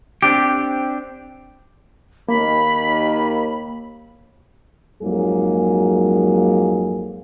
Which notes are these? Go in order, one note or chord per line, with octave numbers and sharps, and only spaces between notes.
C4 D4 G4
D#2 A#3 B5
F2 G#2 F#3 A#3 G#4